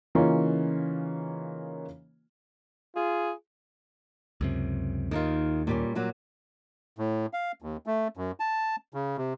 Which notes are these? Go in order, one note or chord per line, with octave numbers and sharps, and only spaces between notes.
C#3 E3 A#3 C#4 D#4 F4
F4 G#4
C#2 F#2 C3
D#2 D#3 D#4 F4
A#2 G3 C#4
A#2 F#3 G3
A2
F5
D#2
A3
F#2
A5
C#3
C3